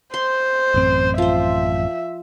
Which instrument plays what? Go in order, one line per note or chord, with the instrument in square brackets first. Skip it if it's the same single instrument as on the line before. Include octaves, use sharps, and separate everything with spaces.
[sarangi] C5 [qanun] C6
[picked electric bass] A1 F#2 C4
[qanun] F3 C5 [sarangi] E5